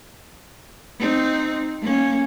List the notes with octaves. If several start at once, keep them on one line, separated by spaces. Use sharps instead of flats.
C4 D#4
A#3 C#4